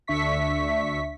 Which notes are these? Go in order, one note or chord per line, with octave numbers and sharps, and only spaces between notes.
D2 D4 E5 C#6 B6